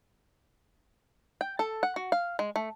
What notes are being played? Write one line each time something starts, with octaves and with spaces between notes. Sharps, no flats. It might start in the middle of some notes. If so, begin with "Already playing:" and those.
G5
A4
F#5
F#4
F5
G#3
A3